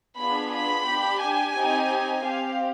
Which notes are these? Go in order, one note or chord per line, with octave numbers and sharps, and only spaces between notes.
B3 D4 F4 G#4 B5
B5
D4 G4
G#5
C4 D#4 G4
C4 G4 F5